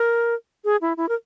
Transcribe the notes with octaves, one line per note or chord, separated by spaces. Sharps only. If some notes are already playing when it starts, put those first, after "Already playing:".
Already playing: A#4
G#4
E4
E4
A#4